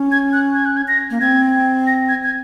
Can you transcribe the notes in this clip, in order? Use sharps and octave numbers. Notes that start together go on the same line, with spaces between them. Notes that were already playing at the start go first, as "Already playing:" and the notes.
Already playing: C#4
G#6
F#6
G#6
F#6
G#6
A#6
A#3
C4 G#6
A#6
G#6
G#6